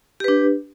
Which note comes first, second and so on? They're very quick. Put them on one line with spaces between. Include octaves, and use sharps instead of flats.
G4 B4 D4